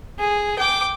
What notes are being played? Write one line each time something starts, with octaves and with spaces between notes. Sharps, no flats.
G#4
G5 D6